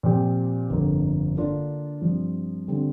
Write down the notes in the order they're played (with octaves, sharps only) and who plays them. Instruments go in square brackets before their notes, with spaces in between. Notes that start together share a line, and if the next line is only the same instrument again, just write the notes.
[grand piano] A#2 F3 C4 G4
G1 F2 D3 A#3
D3 A#3 D4 F4
G2 F3 C4 F4
D3 G3 C4